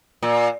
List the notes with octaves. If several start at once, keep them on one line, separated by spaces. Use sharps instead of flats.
A#2